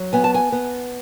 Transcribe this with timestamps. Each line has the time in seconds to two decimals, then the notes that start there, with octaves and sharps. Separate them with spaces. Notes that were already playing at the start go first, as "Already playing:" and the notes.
Already playing: F#3
0.13 B3 G#5
0.24 A5
0.34 G#5
0.52 B3